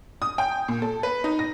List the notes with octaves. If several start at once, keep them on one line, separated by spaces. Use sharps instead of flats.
D#6
G5
A#2
A4
B4
D#4
A#6